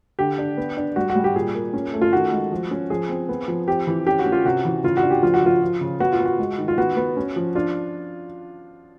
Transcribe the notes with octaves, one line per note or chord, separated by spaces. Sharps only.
D3 G4
D4
B3
D4
G3 F#4
F#4
G3
G4
A#2 G#4
A#3
C#4
A3
F4
D#3 F#4
G#3
F3
C#4
F3 G#4
C4
B3
F3
C4 G4
E3
C#4 G4
F#4
C#4
F4
C3 F#4
E3
C#3 F4
F#4
D4
G4
F3 F4
F#4
F3 F4
F3
C#3
B3 F#4
F4
B3
F#4
G#3
D#3
F4
B3 F#4
B3
C#4
F3
D4 F4